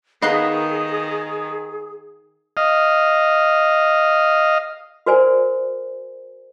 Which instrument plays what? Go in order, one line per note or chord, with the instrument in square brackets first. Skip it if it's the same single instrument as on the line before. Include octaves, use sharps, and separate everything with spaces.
[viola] D#3 [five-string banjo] B3 D#4 D#5 [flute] G#4 [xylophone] F5 F#6 C7
[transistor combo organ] D#5 F5
[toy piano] F#4 A#4 C5 D5 G#5